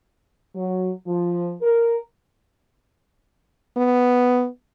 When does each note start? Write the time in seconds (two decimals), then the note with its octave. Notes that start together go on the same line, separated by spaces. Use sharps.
0.55 F#3
1.07 F3
1.62 A#4
3.77 B3